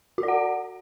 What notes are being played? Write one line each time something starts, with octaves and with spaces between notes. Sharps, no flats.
F#4
D5
F#5